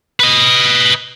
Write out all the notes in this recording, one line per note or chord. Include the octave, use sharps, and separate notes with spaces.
B4 D#5